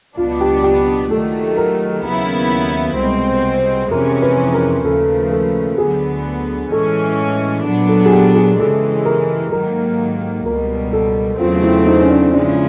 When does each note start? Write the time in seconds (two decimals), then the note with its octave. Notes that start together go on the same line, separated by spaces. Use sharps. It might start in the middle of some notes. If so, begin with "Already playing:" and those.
0.17 C#2 B2 F#3 B3 D4 F4
0.41 G4
0.63 G4
1.11 D#3 F#3 A3 A4
1.57 A#4
2.04 D#2 C#3 F#3 B3 E4
2.97 C2 B2 G#3 C4
3.91 F2 C3 E3 G#3 C#4 A#4
4.22 B4
4.54 A#4
4.85 D#2 C#3 F3 A3 A4
5.32 A4
5.78 D2 D3 F#3 B3 G#4
6.71 A2 E3 G#3 C#4 A4
7.65 A#2 F#3 B3 D4
7.89 A4
8.06 G#4
8.12 G4
8.35 G#4
8.58 C#3 E3 G#3 A4
9.05 A#4
9.52 G#2 D#3 F#3 A#3 A#4
10.46 C#2 B2 G3 A#4
10.93 A4
11.39 E2 C#3 F#3 A3 C4 F4
11.63 E4
11.86 D#4
12.02 C#4
12.09 D4
12.33 C#3 F3 G#3 D4